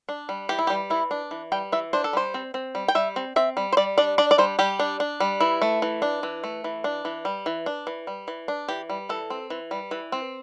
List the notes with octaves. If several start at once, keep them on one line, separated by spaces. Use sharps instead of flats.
D4
G3
E3 G4
E4
G4
G3
E3 E4
D4
E3
G3 G5
E3 E5
D4 C5
A4
G3 C5
C4
C4
G3
G5
G3 E5
C4
C4 E5
G3
C5
G3 D5
D4 D5
D4 D5
D5
G3 C5
G3 G4
D4
D4
G3
E3 E4
A3
E3
D4
E3
A3
E3
D4
E3
G3
E3
D4
E3
G3
E3
D4
E3 G4
G3
E3 A4
C4
E3
G3
E3
C4